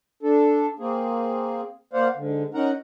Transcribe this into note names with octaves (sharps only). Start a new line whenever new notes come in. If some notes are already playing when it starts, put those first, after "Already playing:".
D4 A4
A#3 C4 G#4
A#3 C5 D5 F5 F#5
G#2 D3
C#4 D#4 A#4 F#5 A#5